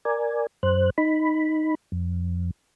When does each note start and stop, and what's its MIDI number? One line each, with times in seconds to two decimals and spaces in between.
0.05 0.46 70
0.05 0.46 74
0.05 0.46 80
0.63 0.90 42
0.63 0.90 72
0.63 0.90 90
0.98 1.75 63
0.98 1.75 83
1.92 2.50 41